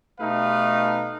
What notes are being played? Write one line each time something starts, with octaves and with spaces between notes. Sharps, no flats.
B2 A3 D#4 G4 B4 F5